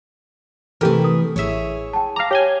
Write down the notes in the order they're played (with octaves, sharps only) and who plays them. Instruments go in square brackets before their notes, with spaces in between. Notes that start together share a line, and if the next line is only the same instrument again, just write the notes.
[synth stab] C3 G4 A#4 [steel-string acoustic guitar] E3 A3 [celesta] A4
[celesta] D#6
[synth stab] A1 E5 [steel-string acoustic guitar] E4 G#4 C#5
[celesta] G5 A5
[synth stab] F5 A#5 [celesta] D6 F6
[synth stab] G4 G#5 [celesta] C#5 G7